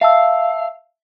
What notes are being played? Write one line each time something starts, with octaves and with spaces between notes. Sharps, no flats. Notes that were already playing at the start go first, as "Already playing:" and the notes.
E5 F5 A5 E6